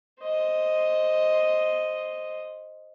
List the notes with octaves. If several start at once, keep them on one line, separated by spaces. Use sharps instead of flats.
C5 D#5